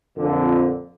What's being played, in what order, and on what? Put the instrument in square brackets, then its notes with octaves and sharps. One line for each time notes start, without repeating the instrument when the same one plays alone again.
[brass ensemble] F2 A#2 D3